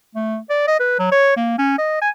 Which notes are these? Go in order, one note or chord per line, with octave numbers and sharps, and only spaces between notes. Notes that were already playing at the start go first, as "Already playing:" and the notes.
A3
D5
D#5
B4
F#3
C#5
A#3
C#4
D#5
G#5